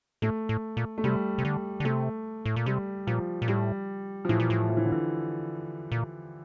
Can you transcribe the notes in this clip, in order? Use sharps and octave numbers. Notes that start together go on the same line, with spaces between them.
A2 A3
A2
A#2
A3
C3 G3
C3
D3
D3
C3 A3
A2
A#2
C3 G3
A#2 F3
A#2
A2 G3
F3
A2 E3
A#2
A2
F3
E3
D3
E3
A#2